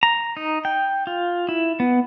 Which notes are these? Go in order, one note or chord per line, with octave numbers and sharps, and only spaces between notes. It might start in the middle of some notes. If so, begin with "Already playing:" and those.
A#5
D#4
G5
F4
E4
B3